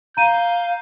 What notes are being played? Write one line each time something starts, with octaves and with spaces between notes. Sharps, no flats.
F5 A#5 G6 D#7